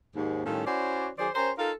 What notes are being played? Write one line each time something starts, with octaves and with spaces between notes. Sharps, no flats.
D#2 G#2
A2 D#3 G3 C#4 F4 A4
C#4 E4 F#4 C5 D5
D#3 F#3 G#4 C5 D5
C#4 G4 A#4 C5
D#4 F4 A4 A#4 F5